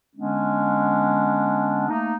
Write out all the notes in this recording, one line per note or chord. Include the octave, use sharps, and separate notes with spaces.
D3 G#3 B3 C#4 D4
A3 A#3 D#4